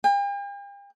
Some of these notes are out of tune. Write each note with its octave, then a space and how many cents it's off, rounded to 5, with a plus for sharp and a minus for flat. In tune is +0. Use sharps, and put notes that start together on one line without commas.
G5 +45